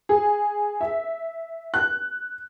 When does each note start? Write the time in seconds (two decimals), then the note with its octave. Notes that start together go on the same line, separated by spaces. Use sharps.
0.09 G#4
0.81 E5
1.74 F#6